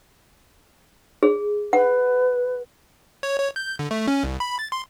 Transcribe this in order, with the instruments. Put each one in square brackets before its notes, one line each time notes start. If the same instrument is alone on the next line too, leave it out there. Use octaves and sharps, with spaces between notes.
[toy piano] G#4
[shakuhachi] B4 [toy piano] F#5
[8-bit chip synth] C#5
C#5
G6
D3
A3
C#4
C2
B5
A6
C6